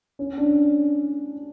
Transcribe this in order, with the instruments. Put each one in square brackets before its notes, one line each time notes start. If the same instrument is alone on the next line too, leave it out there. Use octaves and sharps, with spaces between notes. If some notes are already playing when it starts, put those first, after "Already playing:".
[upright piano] C#4
D4